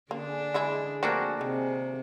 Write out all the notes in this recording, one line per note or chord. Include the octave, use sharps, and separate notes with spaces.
D3 A#3 D4 G#4
E3 G#3 E4
F3 A3 A#3 C4 D4 F#4
C3 D#3